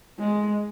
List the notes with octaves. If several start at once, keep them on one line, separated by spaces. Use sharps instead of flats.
G#3